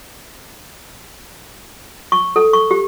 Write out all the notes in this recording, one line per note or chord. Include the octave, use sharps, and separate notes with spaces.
C#6
A4
C#6
G4